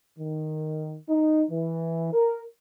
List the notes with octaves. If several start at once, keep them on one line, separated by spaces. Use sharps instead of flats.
D#3
D#4
E3
A#4